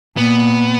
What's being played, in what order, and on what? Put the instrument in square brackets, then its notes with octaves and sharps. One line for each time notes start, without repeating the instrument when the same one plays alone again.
[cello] A#2 [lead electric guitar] B3